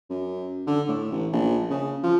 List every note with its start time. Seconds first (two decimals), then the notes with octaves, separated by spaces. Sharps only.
0.09 F#2
0.67 D3
0.88 A2
1.12 A1
1.32 A#1
1.70 C#3
2.03 F3